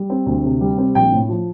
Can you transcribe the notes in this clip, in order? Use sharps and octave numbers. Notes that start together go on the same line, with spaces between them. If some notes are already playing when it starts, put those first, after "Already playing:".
Already playing: G3
C4
D2
C3
G3
C4
A#1 G5
A2
F3